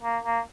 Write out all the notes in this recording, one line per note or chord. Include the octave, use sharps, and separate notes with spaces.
A#3
A#3